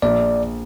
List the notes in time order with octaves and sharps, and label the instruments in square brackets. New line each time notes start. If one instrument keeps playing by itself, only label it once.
[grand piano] A#1 [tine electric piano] D5